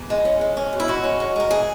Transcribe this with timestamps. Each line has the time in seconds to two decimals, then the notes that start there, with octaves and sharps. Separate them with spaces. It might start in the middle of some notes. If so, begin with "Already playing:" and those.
Already playing: E2
0.10 G#3
0.25 C#4
0.41 G#3
0.57 C#4
0.73 B2
0.80 E4
0.88 G#3 F#4
1.04 C#4
1.20 G#3
1.36 G#3 A#4
1.51 E3 G#4